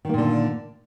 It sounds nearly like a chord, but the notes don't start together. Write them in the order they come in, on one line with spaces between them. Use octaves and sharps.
D#3 A#3 A#2 D3